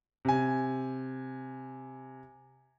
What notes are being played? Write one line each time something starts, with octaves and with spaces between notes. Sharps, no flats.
C3 G#5